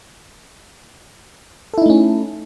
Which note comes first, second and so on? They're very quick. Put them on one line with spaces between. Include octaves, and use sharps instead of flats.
A4 E4 D#4 A3 C#4